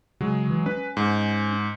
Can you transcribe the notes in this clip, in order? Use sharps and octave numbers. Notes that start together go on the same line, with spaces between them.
C#3 F#3 G#3
E3
C#4 B4
G#2